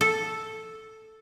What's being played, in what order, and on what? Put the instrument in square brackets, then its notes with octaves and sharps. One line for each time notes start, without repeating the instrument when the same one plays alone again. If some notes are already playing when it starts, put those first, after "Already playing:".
[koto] A4